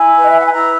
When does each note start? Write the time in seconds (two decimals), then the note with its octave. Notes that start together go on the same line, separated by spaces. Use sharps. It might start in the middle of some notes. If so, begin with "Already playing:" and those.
Already playing: E4 G#5
0.16 B4
0.22 D#5
0.30 E5
0.38 F#5
0.45 G#5
0.53 E4 A#5